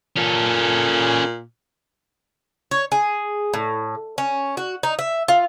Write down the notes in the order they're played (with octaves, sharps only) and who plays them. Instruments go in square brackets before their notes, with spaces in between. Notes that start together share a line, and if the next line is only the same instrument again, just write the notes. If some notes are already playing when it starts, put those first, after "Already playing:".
[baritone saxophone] A#2 [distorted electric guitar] C#4 A4
[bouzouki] C#5
G#4
A2
C#4
F#4
D#4
E5
F4